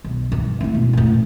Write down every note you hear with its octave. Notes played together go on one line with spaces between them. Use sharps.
B1
G2 E3
A3 E4
B2
A1 A2